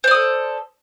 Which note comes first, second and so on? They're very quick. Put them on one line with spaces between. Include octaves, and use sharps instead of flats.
C5 D5 D#6 A4